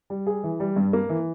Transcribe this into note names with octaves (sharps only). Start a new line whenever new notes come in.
G3
G#4
E3
G3
G2
A#3
E3